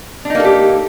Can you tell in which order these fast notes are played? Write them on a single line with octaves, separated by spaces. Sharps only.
D4 D#4 A#3 A4 G4